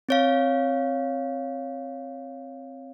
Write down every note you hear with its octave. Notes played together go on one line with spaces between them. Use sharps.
C4 C#5 F5